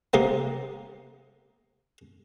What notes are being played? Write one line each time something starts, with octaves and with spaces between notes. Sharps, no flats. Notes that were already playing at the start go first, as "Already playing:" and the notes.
C3 A#3 B3